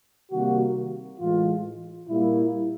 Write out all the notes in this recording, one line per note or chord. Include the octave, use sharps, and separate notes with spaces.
C3 D#3 G3 A#3 F#4
A2 E3 G#3 F4
A#2 G3 A#3 E4